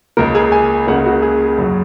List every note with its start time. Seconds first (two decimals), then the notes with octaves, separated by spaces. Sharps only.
0.17 C#2 C#3 A#3 A#4
0.35 G#4
0.52 G#5
0.87 C#2 C#3 A#3 F#5
1.06 F#4
1.22 G#4
1.57 F#2 C#3 F#3